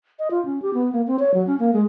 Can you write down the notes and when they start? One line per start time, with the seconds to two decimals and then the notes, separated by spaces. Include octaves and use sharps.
0.19 D#5
0.31 F4
0.45 C#4
0.62 G4
0.74 B3
0.93 A#3
1.07 C4
1.19 C#5
1.34 F#3
1.47 C#4
1.59 A#3
1.73 G#3